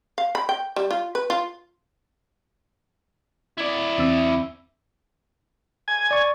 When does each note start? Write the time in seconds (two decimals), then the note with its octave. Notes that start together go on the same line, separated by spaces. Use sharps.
0.18 F5
0.35 B5
0.49 G5
0.76 G3
0.91 F4
1.15 B4
1.30 F4
3.58 E4 D5
3.98 E2 C4 E6
5.88 G#5
6.11 D5 C#6